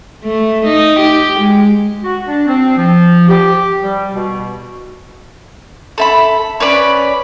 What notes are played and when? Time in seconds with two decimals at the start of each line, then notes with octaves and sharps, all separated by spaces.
0.24 A3
0.66 D#4
1.00 G4
1.40 G#3
2.04 F#4
2.26 D4
2.46 C4
2.77 F3
3.28 G4
3.82 G3
4.14 B2
5.98 A4 E5 B5
6.60 C#4 B4 D5 B5